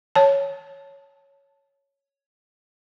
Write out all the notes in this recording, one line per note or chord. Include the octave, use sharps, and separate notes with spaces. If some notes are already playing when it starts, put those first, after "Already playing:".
C#5 A5